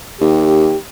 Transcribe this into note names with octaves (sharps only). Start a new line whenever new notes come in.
D#2 G4